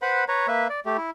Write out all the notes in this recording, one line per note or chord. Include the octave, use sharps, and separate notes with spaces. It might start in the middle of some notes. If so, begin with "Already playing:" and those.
B4 C5 F#5 B5
B4 C#5 A#5
A#3 B4 E5
D5
A3 G4
E4